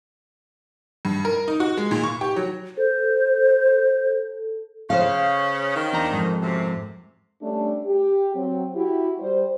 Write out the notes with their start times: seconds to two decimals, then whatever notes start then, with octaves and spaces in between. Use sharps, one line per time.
1.05 G2
1.25 A#4
1.48 D#4
1.60 F#4
1.77 G#3
1.91 A#2
2.04 C#6
2.21 G4
2.36 F#3
2.77 A4 C5
4.90 C#3 C#4 C5 F5
5.76 D#3
5.93 E2 D4 A#5
6.12 F2 G#2
6.42 F#2 C3
7.41 G3 A3 C#4 D4
7.86 G4
8.35 F#3 C4
8.76 E4 F#4 G4
9.20 G3 C5